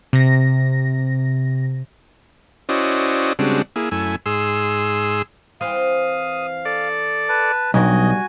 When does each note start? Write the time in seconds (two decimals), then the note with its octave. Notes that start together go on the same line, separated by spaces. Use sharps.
0.13 C3 A#6
2.69 C#4 E4 F#4 C5 D5 D#5
3.39 C#3 G3 G#3 C4 D4 F#4
3.76 A#3 E4 G#4
3.91 F#2 A3 E4 G#5
4.26 G#2 G#4 C6 E6
5.61 E3 C4 B4 F5 D#6
6.65 A4 D5
7.29 B4 A5
7.74 B1 E3 G3 D4 F#4 D#5 G#5